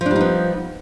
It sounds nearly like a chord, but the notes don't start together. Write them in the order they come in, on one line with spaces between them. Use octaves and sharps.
F3 D4 G3 D#4 B3